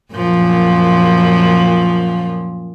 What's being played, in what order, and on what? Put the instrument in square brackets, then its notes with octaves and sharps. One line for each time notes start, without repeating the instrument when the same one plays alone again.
[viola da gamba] F#2 A#2 F3